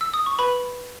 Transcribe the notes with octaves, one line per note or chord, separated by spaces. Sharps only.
E6
D#6
C#6
B4 B5